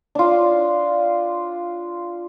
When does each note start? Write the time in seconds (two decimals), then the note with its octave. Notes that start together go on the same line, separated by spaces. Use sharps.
0.15 D4 F4